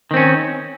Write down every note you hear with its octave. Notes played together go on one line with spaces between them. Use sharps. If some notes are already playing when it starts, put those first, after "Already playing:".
D#3 C4 C#4